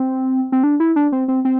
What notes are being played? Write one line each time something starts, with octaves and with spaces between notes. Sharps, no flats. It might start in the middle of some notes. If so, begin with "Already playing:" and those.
Already playing: C4
C4
D4
E4
D4
C4
C4
C4